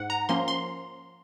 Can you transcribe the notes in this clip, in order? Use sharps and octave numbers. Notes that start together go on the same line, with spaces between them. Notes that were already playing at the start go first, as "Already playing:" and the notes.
Already playing: G#2 F#5
A#5
F3 A#3 C#4 C6
C6